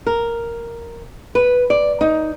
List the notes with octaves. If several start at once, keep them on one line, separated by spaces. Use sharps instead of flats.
A#4
B4
D5
D#4